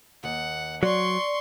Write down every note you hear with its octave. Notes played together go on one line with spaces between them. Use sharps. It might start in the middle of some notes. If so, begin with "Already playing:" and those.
D#2 F#5
F#3 D5 C6 C#6